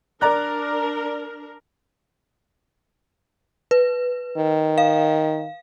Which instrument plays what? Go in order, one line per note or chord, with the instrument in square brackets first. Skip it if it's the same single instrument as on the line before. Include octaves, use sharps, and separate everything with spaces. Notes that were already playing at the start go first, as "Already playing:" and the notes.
[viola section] D4 A#4 [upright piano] D5 A#5 F#6
[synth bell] B4
[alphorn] D#3
[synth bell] F5